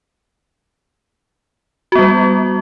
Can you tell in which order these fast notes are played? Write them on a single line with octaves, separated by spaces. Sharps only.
F#4 B3 G3